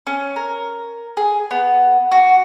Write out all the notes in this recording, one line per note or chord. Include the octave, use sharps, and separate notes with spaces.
C#4
A#4
G#4
B3
F#4